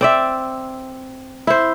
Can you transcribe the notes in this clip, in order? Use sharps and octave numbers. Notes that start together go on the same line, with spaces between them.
C4 D5 E5
E4 C5